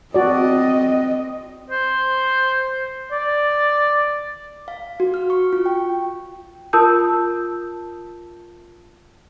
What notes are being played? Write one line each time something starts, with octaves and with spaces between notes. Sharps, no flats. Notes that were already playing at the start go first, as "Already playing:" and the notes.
C4 F#4 D5 D#5
C5
D5
F5
F#4
F6
C#6
F4
G5
F4 A#4 A5 D#6 E6 G6